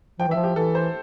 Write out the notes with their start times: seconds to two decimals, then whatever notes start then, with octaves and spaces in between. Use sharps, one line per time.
0.19 F3 G5
0.28 E3
0.31 E5
0.35 F3
0.43 G4
0.55 E3 A4
0.75 C5